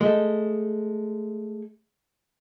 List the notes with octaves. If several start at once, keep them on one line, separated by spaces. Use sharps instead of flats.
G#3 A3